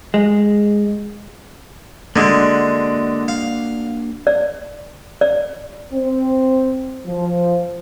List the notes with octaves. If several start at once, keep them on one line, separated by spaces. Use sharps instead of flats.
G#3
D3 G#3 A#3 D4 F#4
F5
D5
D5
C4
F3